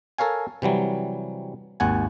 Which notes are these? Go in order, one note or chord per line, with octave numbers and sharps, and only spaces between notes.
A4 A#4 C#5 F5 G#5
C3 E3 F#3 G3
G#1 D#2 F#5 G#5